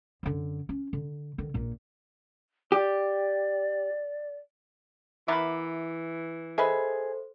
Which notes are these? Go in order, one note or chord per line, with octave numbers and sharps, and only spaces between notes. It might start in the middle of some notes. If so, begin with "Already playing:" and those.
F#2 D3
C#4
D3
D3 D#3
A#1 A#2
G4 D5
E3 B3 A#4 E5 B5 D6
G#4 A4 B4 C5 D#5 E5